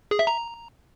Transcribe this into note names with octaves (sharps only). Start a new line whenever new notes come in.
G#4
E5
A#5